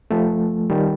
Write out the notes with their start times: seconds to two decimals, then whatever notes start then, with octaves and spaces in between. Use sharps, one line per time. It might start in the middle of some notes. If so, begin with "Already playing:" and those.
0.11 F3 A3
0.70 D#3 G3